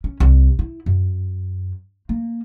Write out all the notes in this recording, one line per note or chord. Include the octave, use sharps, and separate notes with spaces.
C#4
C2
E4
F#2
A#3